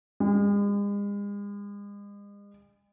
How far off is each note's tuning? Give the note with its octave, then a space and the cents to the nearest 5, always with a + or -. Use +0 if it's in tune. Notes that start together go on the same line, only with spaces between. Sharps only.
G#3 -40